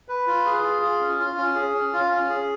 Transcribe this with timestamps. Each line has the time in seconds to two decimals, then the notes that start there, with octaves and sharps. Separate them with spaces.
0.08 B4
0.27 F4
0.46 G#4
0.64 F4
0.82 G#4
1.01 C#4
1.19 F4
1.37 C#4
1.55 G#4
1.74 C#4
1.93 F4
2.11 C#4
2.29 G#4